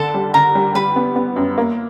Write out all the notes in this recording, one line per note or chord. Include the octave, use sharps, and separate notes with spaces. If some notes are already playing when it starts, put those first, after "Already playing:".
Already playing: D3 A4 A5
G3
D3 A#4 A#5
G3
G3 B4 B5
B3
B3
F#2
A#3